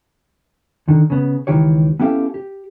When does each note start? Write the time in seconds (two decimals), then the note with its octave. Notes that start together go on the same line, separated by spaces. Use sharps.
0.88 D3 D#3
1.10 C#3 B3
1.47 C#2 D#3 E3 G4 C#5
2.00 B3 C#4 E4 G4 A4 F5
2.34 G4